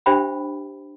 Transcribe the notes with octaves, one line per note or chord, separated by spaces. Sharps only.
D4 G4 C5 E5 G5 B5